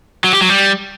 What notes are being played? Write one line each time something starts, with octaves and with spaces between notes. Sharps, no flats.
F#3
G4
F#3
G3